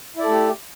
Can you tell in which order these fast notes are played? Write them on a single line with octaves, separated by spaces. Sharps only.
E4 D5 A4 A3 G4